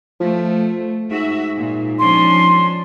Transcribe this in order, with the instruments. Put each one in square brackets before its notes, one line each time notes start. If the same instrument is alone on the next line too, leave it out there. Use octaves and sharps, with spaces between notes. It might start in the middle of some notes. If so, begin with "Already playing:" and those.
[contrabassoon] F3 [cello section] A3
[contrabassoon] G#2 [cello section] F#4 E5
[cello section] A#2
[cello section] F3 C#4 D4 [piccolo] C6